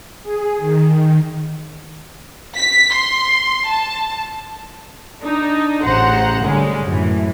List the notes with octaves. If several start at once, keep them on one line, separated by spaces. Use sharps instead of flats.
G#4
D#3
B6
C6
A5
D4 D#4
A1 C#3 C5 F#5 A#5
D3 G3 G#3 C#4
F#2 A2 E3